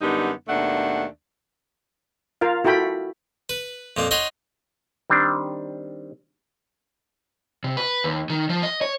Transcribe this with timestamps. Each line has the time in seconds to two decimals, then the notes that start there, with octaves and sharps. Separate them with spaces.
0.01 F#2 D3 G3 B3 D#4
0.48 D#2 B2 A3 D4 F#5
2.41 F4 A#4 F5
2.65 E4 F#4 A4 G5 B5
3.49 B4
3.97 F2 A#2 A#3
4.11 D#4 C#5 D#5 F#5 C6
5.10 D#3 G3 C4 D4
7.64 C3
7.77 B4
8.04 D#2
8.30 D#3
8.49 F3
8.63 D#5
8.82 C#5